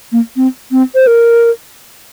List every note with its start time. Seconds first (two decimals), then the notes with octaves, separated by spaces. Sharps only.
0.12 A#3
0.36 C4
0.72 C4
0.95 C5
1.07 A#4